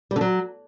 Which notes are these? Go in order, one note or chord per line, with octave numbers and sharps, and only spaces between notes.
G3
D3
F#3